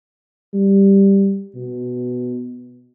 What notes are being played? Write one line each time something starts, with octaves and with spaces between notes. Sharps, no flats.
G3
B2